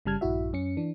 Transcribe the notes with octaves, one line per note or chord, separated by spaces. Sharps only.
G1 C#3 G3 A5 F6 G#6
A#1 G2 E4 F#4 E5
F#2 C#4 C#7
E3 D4